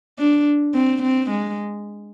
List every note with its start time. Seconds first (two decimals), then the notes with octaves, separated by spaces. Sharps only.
0.19 D4
0.74 C4
1.03 C4
1.30 G#3